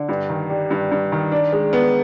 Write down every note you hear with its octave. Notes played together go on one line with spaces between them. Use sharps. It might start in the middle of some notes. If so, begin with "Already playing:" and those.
Already playing: D3
G2
D#3
G3
G2
G2
D#3
D4
G#3
B3